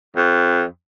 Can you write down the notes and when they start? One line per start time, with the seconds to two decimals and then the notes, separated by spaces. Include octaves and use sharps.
0.16 F2